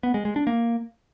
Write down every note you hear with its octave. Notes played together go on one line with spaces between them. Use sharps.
B3
G#3
G#3
D4
A#3